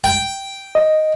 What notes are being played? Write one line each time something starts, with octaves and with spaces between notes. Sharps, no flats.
G5
D#5